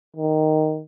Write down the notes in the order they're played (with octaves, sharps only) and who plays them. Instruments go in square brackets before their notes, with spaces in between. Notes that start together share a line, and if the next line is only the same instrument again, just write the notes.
[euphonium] D#3